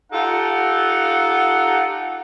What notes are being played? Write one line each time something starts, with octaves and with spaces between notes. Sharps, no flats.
D#4 F4 G4 A4 F#5